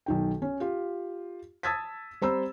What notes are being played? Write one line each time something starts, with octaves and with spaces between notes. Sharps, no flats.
B1 D#3 G5
C#4
F4 G4
A5 D#6 E6 G#6 A6 B6
G3 C4 C5 A#5 B5 E6